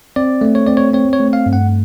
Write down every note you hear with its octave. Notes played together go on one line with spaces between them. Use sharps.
C4 D5
A3
C#5
C4 D5
C#5
C4 C#5
C#5
A3
F5
G2
F#5